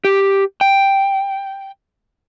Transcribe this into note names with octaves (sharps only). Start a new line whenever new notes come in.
G4
G5